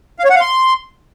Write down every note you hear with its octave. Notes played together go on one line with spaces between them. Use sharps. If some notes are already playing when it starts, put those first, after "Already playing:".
F5
C#5
F#5
F5
C6